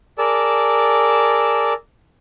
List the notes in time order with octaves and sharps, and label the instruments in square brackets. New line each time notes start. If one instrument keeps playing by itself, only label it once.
[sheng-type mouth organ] G#4 A#4 D5 A5 E6